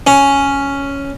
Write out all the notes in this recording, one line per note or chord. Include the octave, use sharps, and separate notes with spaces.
C#4